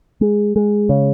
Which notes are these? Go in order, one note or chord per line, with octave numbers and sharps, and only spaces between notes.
G#3
G#3
C#3